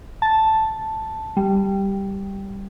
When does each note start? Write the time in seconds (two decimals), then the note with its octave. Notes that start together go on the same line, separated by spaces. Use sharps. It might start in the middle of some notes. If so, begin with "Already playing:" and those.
0.22 A5
1.37 G3